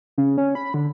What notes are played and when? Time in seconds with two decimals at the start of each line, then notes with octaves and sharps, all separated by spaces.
0.18 C#3
0.38 C#4
0.55 B5
0.74 D3